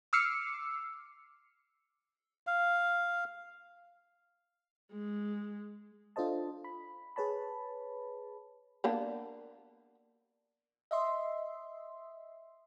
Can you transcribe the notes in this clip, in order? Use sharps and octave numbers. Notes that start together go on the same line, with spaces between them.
D6 E6 F6 C7 C#7
F5
G#3
D4 F4 A4 C5 D#5 A5
B5
G#4 B4 C#5 A5 B5
A#3 B3 D4
D#5 E5 C6